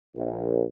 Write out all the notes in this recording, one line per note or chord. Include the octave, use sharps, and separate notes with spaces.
A#1